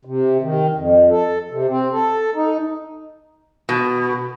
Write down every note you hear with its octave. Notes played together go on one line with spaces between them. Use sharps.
C3
D#3
F2
A4
C3
C4
A4
D#4
B2